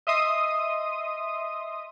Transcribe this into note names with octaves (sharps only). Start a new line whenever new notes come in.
D#5 E5 C6 D#6